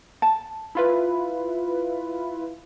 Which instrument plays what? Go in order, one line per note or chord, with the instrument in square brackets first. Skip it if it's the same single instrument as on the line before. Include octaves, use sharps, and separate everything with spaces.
[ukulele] A5
[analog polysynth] E4 F4 B4